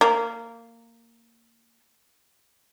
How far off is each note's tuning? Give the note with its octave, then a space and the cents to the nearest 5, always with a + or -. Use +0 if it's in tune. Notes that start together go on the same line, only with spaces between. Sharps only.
A#3 -15